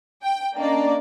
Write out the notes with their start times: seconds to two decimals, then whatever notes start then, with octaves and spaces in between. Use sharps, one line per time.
0.23 G5
0.57 A#3 C#4 D4 D5 D#5 A#5